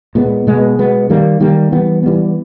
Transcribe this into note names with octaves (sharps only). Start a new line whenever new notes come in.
A#2 G#3 B3
B2 G#3 B3
B2 G#3 B3
D#3 G3 A#3
D#3 G3 A#3
E3 G3 B3
E3 G3 B3